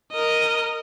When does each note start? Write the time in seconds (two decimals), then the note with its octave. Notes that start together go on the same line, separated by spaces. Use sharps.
0.12 A#4 D#5